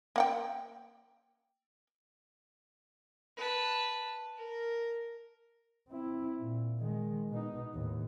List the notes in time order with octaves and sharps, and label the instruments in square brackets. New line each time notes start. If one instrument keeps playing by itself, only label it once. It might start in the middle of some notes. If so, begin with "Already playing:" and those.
[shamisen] A#3 F#5 G5
[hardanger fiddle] B4 A5
A#4
[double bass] C4 E4
A#2
D#3 G#3
B2 D#4
D#2 A2